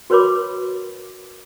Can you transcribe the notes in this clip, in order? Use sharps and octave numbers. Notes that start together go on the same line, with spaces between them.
F#4 A#4 B4 C#5 B5 D6